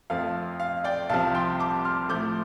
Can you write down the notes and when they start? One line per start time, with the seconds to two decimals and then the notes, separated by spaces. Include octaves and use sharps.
0.10 F2 F3 A3 F5
0.60 F5
0.84 D5 G5
1.09 C2 C3 F3 F5 A5
1.35 G5 C6
1.59 A5 D6
1.85 C6 F6
2.09 A2 F3 A3 D6 G6